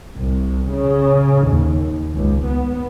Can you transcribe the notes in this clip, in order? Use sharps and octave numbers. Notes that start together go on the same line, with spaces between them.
C2
C#3
D#2
C#2
B3